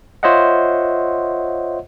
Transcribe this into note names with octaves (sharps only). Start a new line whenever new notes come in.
F4 C5 C#5 D#5 E5 F#5